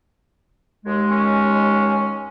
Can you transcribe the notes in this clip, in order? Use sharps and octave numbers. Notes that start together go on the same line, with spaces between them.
D#2 G#3
C#4